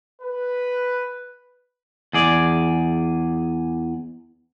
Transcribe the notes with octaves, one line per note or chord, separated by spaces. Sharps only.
B4
E2 G#4 D5